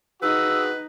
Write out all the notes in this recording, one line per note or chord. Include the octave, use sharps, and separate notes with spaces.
D#4 F#4 G#4 B4 E6